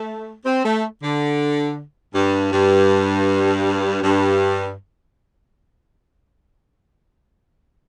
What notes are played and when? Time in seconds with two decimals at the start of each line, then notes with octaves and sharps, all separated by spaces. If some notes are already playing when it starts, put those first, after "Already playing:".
Already playing: A3
0.45 C4
0.64 A3
1.02 D3
2.14 G2
2.52 G2
4.02 G2